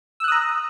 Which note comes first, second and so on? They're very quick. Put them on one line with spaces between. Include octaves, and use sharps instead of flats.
E6 F#6 D#6 A#5